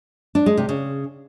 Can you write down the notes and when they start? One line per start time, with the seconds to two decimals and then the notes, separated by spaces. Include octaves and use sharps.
0.35 D4
0.46 G#3
0.57 C3
0.69 C#3